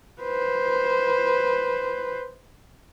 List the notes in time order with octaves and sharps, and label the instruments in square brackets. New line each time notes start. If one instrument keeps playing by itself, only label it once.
[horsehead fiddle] B4 C5